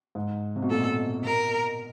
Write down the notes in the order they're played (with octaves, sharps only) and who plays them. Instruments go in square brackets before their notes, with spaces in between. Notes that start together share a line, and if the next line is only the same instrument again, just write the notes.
[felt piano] G#2
C3
B2
[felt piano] A#2 [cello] A4
[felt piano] B2 [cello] A#4